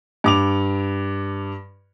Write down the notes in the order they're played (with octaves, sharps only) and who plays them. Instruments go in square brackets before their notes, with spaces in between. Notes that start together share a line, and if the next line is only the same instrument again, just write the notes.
[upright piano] G2 D6 F7